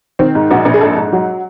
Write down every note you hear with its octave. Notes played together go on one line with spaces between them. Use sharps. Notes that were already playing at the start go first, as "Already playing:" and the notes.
D#3 C4
G#2
A#1 F#4
A#1
G#4
G#2 A4
G#2
F#3